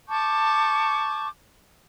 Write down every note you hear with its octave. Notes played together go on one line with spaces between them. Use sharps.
A5 C#6 D6 G6